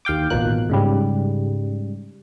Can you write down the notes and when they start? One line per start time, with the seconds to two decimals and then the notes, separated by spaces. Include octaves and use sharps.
0.05 D#2 F5 G5 D6
0.30 A1 D#2 B2 F3 A#3 F#6
0.69 G#2 C#3 G3